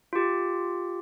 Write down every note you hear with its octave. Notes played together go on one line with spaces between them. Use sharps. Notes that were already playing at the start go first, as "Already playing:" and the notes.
F4 G4